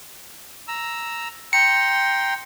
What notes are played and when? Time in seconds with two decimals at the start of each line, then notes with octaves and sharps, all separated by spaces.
0.68 A#5 E6
1.53 G5 A#5 C6 C#7